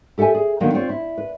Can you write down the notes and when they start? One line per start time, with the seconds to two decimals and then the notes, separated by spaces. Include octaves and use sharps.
0.18 G4 A4 E5 G5 G#5
0.35 G#4
0.60 D3 D#3 F#3 A#3 B3
0.74 C4 F4 C5 C#5
0.89 E4
1.18 B4